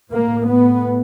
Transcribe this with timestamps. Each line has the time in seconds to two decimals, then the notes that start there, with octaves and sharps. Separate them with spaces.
0.12 A2 A#3
0.47 B3